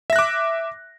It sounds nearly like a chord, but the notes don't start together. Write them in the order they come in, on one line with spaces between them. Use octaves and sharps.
E5 A#6 F#6 D6